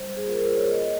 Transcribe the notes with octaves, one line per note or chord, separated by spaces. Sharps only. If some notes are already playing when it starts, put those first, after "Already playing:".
Already playing: G3 C5
G#4
A#3 F4 A#4
C5
C#5
A#3 D#5